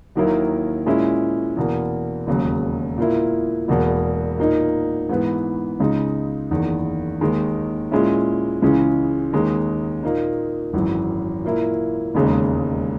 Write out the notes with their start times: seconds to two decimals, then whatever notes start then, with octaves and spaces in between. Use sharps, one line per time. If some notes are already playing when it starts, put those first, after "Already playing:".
0.15 D#2 D#3 F#3 A#3 E4
0.86 A#2 G#3 C#4 E4
1.57 E2 B2 A#3
2.27 E1 D#2 C#3 F#3
2.98 A#2 A#3 E4
3.68 E1 E2 B2 A#3
4.39 A#2 A#3 D#4
5.09 G#2 E3 B3
5.80 C#2 C#3 G#3 D#4
6.50 F#1 E2 D#3
7.21 D#2 D#3 G#3 D#4
7.91 A#2 G#3 C#4 E4
8.62 C#2 C#3 E3 G#3 C#4
9.33 D#2 D#3 G#3 D#4
10.03 A#2 A#3 D#4
10.73 G#1 F#2 E3
11.44 A#2 A#3 E4
12.15 E1 D#2 C#3 G#3 D#4